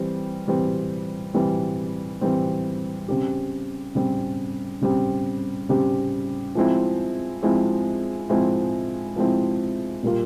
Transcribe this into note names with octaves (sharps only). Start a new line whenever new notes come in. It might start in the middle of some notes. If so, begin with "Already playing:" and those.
Already playing: E3 G3 C4
E3 G3 C4
E3 G3 C4
E3 G3 C4
C#3 G3 C4 G4
C#3 G3 C4 G4
C#3 G3 C4 G4
C#3 G3 C4 G4
F3 G#3 C4 E4
F3 G#3 C4 E4
F3 G#3 C4 E4
F3 G#3 C4 E4
A#2 G3 A#3 F4